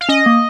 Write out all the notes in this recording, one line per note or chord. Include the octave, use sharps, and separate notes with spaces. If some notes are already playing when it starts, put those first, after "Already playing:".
F5
C#4 D#5
A#3